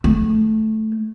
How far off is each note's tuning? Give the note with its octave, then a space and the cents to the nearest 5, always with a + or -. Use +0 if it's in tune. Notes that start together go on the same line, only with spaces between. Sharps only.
A3 -10